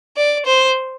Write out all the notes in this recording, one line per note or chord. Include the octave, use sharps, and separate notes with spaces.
D5
C5